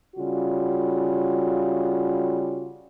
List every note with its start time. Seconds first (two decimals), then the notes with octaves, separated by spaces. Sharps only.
0.16 C#3 G3 F4 F#4